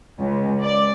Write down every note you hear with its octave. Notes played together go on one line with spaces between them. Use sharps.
C#2
D5